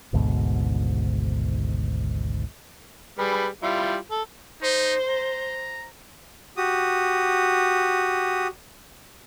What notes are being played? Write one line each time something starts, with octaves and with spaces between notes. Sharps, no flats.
G#1 D2 G#2 B2
G3 G#4 B4
G3 E4 F4
A4
D#4 C5
A#5
F#4 G4 D#6